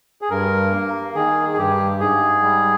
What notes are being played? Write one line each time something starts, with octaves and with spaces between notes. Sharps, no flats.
G#4
G2 A#4
A#3
D#3 G#4
G#4
G2 G4
G#2 G#4
G3